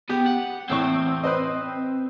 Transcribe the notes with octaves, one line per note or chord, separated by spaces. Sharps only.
B3 G4
F#5
E2 A2 C4 C#6
B4 C5 D#5